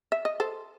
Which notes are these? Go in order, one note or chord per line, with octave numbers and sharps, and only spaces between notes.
E5
D#5
A4 C5